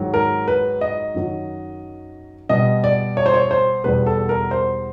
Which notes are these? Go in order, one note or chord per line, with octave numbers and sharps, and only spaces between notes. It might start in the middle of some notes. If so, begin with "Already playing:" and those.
Already playing: G#2 D#3 F#3
A#4
B4
D#5
F#2 D#3 F#3
B2 G3 D#5
D5
C#5
C5
C#5
C5
E2 B2 G3 B4
A4
A#4
C5